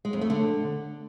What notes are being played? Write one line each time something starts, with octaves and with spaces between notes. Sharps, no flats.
G#3
F2
A3
D3